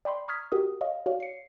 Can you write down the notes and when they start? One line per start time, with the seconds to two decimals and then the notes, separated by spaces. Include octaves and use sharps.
0.05 D5 G5 B5 C6
0.28 A#5 C#6 D#6 F6 G#6 B6
0.52 F#4 G4 A#4 D#6
0.81 C#5 D#5 F5
1.06 F#4 C#5 D5 F5
1.20 C7 C#7